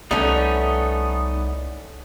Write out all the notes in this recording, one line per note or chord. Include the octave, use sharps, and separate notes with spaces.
C2 A3 B3 C#4 D#4 D5